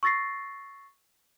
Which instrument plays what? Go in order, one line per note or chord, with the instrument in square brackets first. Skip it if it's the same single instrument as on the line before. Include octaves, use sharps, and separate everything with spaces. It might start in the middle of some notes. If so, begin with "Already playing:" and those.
[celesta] C#6 E6 A6 A#6 C7